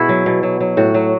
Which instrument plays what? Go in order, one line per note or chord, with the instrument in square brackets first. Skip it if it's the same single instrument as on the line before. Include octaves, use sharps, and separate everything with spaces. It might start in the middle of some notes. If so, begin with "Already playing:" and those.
Already playing: [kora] B2 E4 F#4 G#4
F#3
B2
F#3
F#3
A2 F#4
F#3